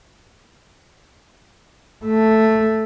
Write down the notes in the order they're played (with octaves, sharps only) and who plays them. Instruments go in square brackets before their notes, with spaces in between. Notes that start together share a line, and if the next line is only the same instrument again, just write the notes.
[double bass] A3